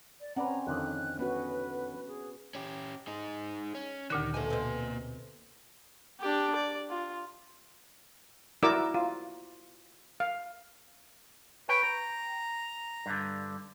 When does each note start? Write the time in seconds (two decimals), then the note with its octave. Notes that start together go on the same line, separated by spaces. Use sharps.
0.20 D5
0.36 C4 C#4 B4 D5 F#5 A#5
0.67 F2 D3 D#3 F#6
1.19 B3 C#4 F#4 B4
2.08 G#4
2.55 C#4 G4
3.07 D#4 G#4
3.75 C#4
4.10 D2 A#2 D3 D#3 G4
4.34 B2 F3 A3 A#3 G#5
4.50 B2 C4
6.21 D4 G4
6.55 D5
6.90 F4
8.63 E4 F#4 A#4 D5 D6 E6
8.94 F4
10.20 F5
11.69 B4 C#5 G5
11.83 A#5
13.06 G2 D3